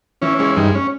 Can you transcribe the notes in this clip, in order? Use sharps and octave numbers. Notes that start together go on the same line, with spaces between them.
E3 C#4
G#3 C#4
G2 D#4
C#4